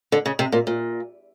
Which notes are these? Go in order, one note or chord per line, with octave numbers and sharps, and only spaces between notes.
D3
C#3
C3
A#2
A#2